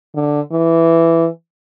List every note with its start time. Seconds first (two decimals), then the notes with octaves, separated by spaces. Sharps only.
0.15 D3
0.52 E3